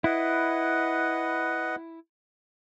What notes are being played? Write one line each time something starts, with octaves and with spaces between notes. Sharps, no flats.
E4 B4 D#5 F#5